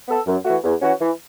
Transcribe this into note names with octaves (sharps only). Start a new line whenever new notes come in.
B3 A4
F#2
E3 A3 F#4
E2
E3 C#4 F#4
E3